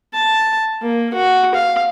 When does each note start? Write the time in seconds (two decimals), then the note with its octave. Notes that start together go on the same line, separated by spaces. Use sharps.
0.14 A5
0.82 A#3
1.14 F#4
1.55 F5